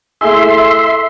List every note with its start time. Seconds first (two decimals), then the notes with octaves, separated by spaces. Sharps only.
0.21 A3 E4 G#4 E5 C6